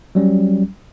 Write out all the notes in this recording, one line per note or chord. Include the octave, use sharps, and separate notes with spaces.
F#3 G3 C#4